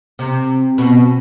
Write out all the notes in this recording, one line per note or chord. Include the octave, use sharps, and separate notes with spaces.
C3
B2